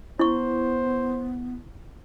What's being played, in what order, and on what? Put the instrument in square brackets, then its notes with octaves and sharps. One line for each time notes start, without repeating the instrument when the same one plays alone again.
[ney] B3 [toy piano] E4 C#6 [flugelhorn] C5